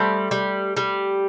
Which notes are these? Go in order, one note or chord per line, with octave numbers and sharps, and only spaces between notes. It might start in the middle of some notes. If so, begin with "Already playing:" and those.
Already playing: G3 A3 C4
G3
G3